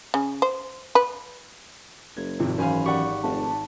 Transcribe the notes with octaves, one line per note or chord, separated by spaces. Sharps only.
C#3
C5
B4
F#1 G#6
G#1 F2 C3
F#2 E3 C5 F5 G#5 B5
G4 D5 F#5 C#6
F1 A5